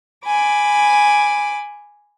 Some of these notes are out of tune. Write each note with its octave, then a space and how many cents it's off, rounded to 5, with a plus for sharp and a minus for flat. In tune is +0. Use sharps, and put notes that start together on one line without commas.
G#5 +0 B5 +5 D6 +0